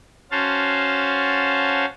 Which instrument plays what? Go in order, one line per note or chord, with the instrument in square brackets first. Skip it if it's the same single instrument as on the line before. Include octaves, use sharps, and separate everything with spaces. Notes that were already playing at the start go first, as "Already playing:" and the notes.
[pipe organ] C#4 F#4 C5 F5 A5